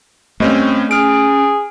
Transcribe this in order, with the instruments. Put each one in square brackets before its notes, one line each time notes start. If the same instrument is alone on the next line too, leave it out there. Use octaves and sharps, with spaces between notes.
[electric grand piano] G2 C4 C#4 [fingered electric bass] A3 [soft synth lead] D#5
[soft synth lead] C#4 [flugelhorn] G#4 [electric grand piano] F6 D7